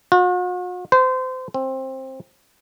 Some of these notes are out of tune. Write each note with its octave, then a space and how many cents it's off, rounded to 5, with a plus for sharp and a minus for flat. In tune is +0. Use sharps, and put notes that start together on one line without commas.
F#4 -45
C5 -30
C4 +15